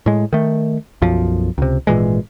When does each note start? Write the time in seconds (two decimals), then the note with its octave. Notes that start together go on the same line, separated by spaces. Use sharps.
0.06 A2 G#3
0.33 D#3 A3
1.02 B1 F#2 F3
1.58 C#2 C3
1.87 G#1 A#2 E3 G#3